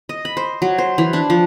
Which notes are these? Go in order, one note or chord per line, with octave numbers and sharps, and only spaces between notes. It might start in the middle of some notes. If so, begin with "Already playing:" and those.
D#5
B5
C5
F#3
C5
E3
D4
F3